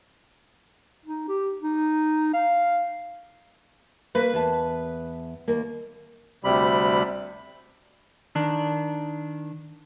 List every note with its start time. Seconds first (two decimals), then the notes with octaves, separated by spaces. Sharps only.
1.06 D#4
1.28 G4
1.62 D#4
2.33 F5
4.15 A#3 B4
4.34 E2 A5
5.48 D#2 A#3
6.44 D2 C3 G3 B5
8.35 D#3 D4